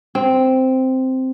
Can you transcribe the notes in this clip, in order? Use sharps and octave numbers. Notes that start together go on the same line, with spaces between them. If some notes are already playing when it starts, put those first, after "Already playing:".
C4